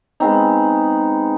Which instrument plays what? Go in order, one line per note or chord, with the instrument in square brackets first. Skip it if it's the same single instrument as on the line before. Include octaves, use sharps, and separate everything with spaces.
[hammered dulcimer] G#3 B3 C4 D#4